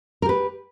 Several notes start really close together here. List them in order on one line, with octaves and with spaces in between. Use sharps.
A#4 G4 B4